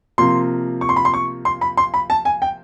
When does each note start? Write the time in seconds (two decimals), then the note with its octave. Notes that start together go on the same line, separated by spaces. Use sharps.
0.18 C3 F3 A#3 C6
0.81 C#6
0.89 C6
0.96 B5
1.05 C6
1.14 C#6
1.45 C6
1.61 B5
1.77 C6
1.94 B5
2.10 A5
2.25 G#5
2.42 G5